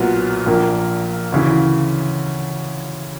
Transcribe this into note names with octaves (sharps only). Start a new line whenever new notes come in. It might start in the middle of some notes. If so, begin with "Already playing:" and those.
Already playing: B1 A#2 F#3 B3
A#1 A#2 A#3
D2 C#3 E3